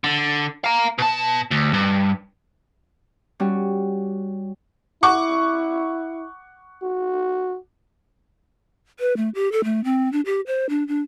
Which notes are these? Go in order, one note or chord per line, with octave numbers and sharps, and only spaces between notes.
D3
F5 A#5
B2 A5
D2
G2
G3 C#4 F#4
E4 F#5 C#6 D6
F#4
B4
A3
G4
A4
A3
C4
D4
G4
C5
D4
D4